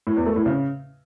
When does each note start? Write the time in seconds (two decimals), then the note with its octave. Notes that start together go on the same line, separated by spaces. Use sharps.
0.07 A2
0.16 E2
0.26 A3
0.36 A2
0.46 C#3